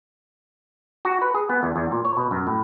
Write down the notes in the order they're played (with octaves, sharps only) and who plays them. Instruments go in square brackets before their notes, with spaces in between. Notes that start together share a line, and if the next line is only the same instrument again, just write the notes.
[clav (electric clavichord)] F#4
B4
G#4
B3
E2
E2
A#2
C#5
B2
F#2
A2